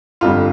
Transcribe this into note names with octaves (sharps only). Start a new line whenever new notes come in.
G1 F2 D3 G3 F4